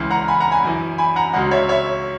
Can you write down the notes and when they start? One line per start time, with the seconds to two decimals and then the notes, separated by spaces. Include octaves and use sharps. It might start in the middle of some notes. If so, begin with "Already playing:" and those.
Already playing: C#2 C#3 E3
0.11 F#5 A#5
0.28 G#5 B5
0.40 F#5 A#5
0.52 G#5 B5
0.63 F#2 E3
0.98 G#5 B5
1.16 F#5 A#5
1.33 C#2 C#3 F#3 D#5 F#5
1.51 C#5 E5
1.69 C#5 E5